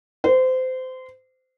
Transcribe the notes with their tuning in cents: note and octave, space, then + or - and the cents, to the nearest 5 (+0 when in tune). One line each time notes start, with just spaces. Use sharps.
C5 -25